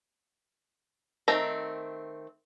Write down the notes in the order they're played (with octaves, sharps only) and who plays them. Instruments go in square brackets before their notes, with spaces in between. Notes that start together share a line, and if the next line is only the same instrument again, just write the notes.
[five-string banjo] D#3 A3 C4 A#5